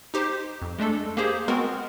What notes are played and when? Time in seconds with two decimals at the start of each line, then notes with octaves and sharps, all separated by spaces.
0.14 D#4 G4 C5
0.62 F2
0.78 G#3 A3 D4 A4
1.17 A#3 G4 G#4 C5
1.48 G#3 B3 C4 F#4 A#4